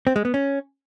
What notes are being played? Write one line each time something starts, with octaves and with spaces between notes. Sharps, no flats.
C4
G#3
B3
C#4